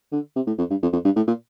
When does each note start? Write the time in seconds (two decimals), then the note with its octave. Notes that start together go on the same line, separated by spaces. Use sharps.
0.12 D3
0.36 C3
0.47 A2
0.58 F2
0.70 G2
0.82 F2
0.93 F2
1.05 G2
1.16 A2
1.27 A#2